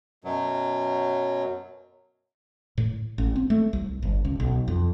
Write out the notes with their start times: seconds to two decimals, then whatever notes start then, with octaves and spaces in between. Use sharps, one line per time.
0.24 F#2 B2 F#3
2.78 A2
3.18 A1
3.36 C4
3.50 A3
3.73 C2
4.02 G1
4.25 C#2
4.40 B1
4.68 F2